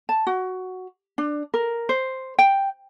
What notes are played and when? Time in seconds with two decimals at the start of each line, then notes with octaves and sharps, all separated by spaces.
0.09 A5
0.27 F#4
1.18 D4
1.54 A#4
1.89 C5
2.39 G5